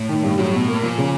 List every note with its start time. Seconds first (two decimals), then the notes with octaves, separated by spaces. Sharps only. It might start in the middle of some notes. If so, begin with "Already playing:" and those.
Already playing: A2
0.09 D#3
0.23 G2
0.38 A2 F#3
0.53 B2
0.68 A#3
0.83 A#2 F3
0.98 C#3